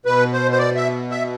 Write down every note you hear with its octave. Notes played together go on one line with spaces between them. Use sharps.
B2 B4
C5
C5
D5
E5
E5